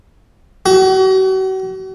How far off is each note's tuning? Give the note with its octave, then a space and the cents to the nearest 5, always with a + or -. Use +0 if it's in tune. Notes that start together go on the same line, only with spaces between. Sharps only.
F#4 +40